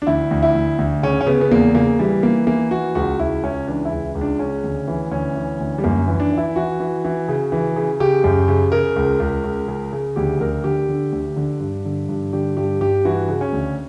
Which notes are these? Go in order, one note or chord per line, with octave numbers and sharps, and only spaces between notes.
D4
D2 E4
D2
E4
D2
D2
C#3 C#4
C#4
C#3 B3
B3
E2 A#3
C#3 A#3
E3 G3
E3 A#3
E3 A#3
E3 F#4
C#2 F#4
C#2 E4
C#2 C#4
E3 D4
E4
C#2
C#2
D4
C#3 C#4
D2
E3
D2 C#4
E3
D2
G3
F#2 A#3
E3
D4
E3
E4
E3 F#4
E3
E3
C#3
E3
C#3
C#3 G4
F#2
C#3
C#3 A#4
C#2
C#2
C#2
C#3
C#3
D2 G4
D2 A#4
D3 G4
D3
D2
D3
G2
D3
G2
D3 G4
G2 G4
G2 G4
E3 F#4
C#3
C#4
D2